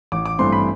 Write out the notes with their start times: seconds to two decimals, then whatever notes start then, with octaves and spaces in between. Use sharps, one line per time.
0.12 A1 D6
0.26 D6
0.39 G2 E3 A3 C4 C6
0.52 B5